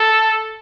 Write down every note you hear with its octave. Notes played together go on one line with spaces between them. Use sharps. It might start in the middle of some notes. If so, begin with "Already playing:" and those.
Already playing: A4